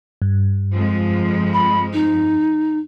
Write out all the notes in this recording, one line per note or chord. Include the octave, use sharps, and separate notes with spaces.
G2
F2 F3 G#3
B5
D#4